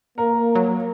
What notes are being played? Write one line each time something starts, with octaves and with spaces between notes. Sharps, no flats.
A#3 A#4
F#3